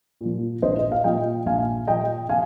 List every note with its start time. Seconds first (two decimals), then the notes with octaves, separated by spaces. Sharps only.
0.21 A#2 F3
0.62 A#1 C5 D#5
0.79 D#5
0.92 F5
1.04 A#2 F3 D#5 G5
1.46 A#1 F5 G#5
1.87 A#2 F3 D#5 G5
2.29 F5 G#5